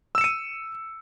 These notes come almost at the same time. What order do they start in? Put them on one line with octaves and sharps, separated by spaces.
E6 E7 C#7 D#7